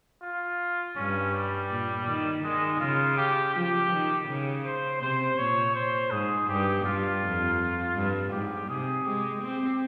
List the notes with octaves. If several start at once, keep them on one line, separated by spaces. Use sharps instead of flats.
F4
G2 C#4
G3
A#2
D#3
D#3 G#3
C#3 F4
G4
F3 G4
D#3
C#3
C5
C3 C5
A#2 C#5
C5
G#2 G#4
G2 G4
G2 F4
F2
G2
G#2 G4
C3 G#4
G#3 G4
C4